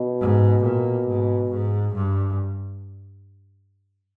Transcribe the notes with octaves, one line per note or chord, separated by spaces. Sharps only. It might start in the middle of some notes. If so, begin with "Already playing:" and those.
Already playing: B2
G#2
A#2
G#2
G#2
G2